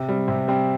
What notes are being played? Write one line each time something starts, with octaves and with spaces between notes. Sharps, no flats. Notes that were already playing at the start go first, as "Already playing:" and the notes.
Already playing: C3
G3 C4
C3
G3 C4